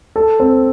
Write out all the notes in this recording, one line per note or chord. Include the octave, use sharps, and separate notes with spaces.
A4
C4